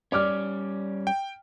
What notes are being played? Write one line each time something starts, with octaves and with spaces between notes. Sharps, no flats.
G3 C#4 D5 D6 F6
G5